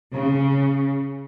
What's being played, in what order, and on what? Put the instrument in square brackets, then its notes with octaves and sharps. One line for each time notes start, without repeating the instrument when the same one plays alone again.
[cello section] C#3